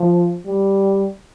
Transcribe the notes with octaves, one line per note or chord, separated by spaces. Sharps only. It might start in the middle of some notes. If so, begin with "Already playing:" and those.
Already playing: F3
G3